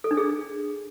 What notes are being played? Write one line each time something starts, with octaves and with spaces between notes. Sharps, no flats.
A4
D4
G#4